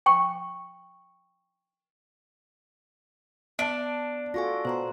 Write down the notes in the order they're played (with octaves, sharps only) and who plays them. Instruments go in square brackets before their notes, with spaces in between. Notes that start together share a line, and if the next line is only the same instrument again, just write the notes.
[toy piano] G5 C#6
[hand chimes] B3 [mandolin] D4 [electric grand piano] A5 D7
[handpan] F4 F#4 A4 [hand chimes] G#5 C#6 A#6
[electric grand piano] B2 [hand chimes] C5 A#5 C6